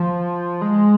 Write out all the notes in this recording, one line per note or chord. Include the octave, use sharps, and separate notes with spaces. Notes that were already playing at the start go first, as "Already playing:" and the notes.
Already playing: F3
G#3